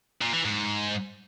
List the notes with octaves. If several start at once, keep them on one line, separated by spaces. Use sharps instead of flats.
A#2
E3
G#2